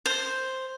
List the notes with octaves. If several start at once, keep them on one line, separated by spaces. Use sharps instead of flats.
C5